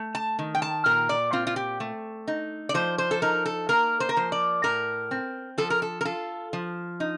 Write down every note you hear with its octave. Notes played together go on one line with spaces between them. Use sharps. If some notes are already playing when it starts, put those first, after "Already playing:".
Already playing: A3
A5
D#3
G5
A5
A#2 A#4
D5
C4 F4
F4
G4
A3
D#4
D5
F3 C5
C5
A4
D#4 A#4
A4
A#3 A#4
C5
A#4
F3 C5
D5
A2 A#4
C4
F3 A4
A#4
A4
A#4
F4 A4
F3
D#4